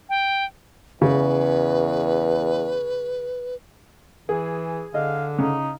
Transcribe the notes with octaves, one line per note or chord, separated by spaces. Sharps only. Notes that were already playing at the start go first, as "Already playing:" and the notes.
G5
E2 C#3 B4
E3 G#4
D3 D#5 F5
C#3 D#4